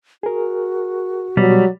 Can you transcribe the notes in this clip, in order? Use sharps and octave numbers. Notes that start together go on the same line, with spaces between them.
F#4 G#4 A#4
B2 F#3 G3